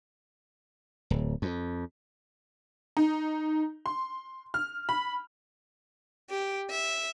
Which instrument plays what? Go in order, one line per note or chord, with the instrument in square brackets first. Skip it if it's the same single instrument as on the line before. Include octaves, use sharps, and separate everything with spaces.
[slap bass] D1
F2
[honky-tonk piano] D#4
C6
F6
B5
[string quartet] G4
E5